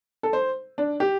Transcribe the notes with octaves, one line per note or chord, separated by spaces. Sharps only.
A4
C5
D4
G4